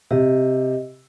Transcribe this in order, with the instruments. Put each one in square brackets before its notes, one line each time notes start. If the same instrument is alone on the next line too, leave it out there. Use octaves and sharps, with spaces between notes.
[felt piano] C3 [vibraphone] G4 D#5